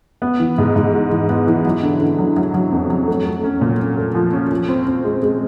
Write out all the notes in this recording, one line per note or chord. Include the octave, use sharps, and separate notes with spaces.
B3
E3
G#2
G#2
G#3
E3
B3
E3
F#3
D3
D3
F#3
F#3
F#3
F2
F#3
A3
A3
C#4
A#2
C#4
A3
F3
C#4
F3
C4
C4
G#3
G#3